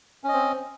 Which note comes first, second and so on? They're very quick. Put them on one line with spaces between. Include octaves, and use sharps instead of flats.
C#4 D#5 C4